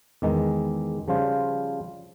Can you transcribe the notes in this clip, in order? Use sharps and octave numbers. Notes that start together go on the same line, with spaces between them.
E2 D#3 G#3
C#3 F3 G3 F4 C5